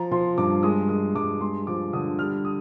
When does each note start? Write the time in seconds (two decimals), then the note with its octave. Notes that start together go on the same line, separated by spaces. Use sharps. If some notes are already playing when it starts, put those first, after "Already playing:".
Already playing: F3 A#5
0.11 F3 C6
0.38 G2 D6
0.63 G#3 D#6
0.89 G#3 D#6
1.15 G2 D6
1.41 G#3 C6
1.67 F3 D6
1.93 D3 D#6
2.18 G3 F6
2.45 D#6